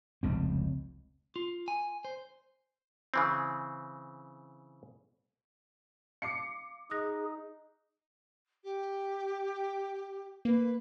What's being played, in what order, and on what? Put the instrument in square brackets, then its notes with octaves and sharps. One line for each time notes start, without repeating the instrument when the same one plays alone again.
[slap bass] F1 C#2 C4
[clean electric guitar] F4
G#5
C5
[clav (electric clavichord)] C#3 E3 C4
[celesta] F5 [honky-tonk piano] D6 C7 C#7
[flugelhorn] D#4 [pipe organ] G#4 [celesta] D#6 F#6 A#6
[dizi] G4
[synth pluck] A#3 [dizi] B4